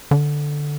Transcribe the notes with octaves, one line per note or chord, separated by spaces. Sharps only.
D3